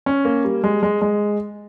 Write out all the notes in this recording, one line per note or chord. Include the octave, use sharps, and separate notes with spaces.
C#4
A#3
G3
G#3
G#3
G#3